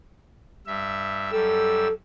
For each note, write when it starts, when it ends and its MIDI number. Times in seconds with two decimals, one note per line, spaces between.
0.66 1.31 43
0.66 1.31 76
1.32 1.87 42
1.32 1.87 55
1.32 1.93 69
1.32 1.87 88